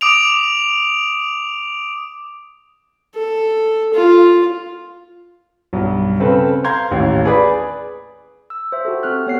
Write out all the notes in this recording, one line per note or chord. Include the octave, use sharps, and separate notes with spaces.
D6 D#6 D7 F7
A4
F4
B1 G2
C#3 C4 A4 B4
F5 A#5 C6 G6 G#6
A1 D#2 A2
G#4 B4 D5 B5
E6
C5 E5
F#4 G4 A4
C4 F#4 A4 F6 F#6
B3 C#5 C7